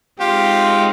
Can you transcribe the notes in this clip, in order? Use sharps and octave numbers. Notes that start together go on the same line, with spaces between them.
G#3 C4 D#4 F4 G4